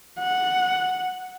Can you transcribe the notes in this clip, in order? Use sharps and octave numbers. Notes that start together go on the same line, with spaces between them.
F#5